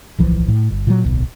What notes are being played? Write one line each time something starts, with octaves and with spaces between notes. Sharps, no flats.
D1 B1 E3 F3
A2
G1
A#2 D3 F#3
D1 B1